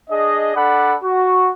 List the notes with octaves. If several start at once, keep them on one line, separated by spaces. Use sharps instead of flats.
D4 G#4 D#5
D4 A4 D5 F#5 B5
F#4